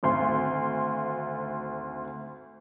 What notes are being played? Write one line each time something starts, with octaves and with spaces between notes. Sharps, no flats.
G#1 D2 C6